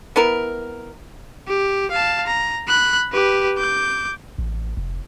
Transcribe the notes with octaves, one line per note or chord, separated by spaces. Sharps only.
B3 E4 A#4
G4
F5 A5
A#5
B5 F#6
G4 B4
D6 G6
A1
F1